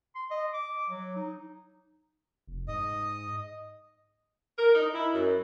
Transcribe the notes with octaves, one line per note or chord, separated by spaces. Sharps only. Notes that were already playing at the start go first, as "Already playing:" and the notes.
C6
D#5
D6
F#3
D#4
F1
G#2 D#5 D#6
A#4
D#4
E4
F#2